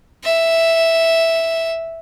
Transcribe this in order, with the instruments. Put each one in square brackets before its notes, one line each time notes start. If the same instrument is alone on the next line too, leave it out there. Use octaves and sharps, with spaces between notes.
[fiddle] E5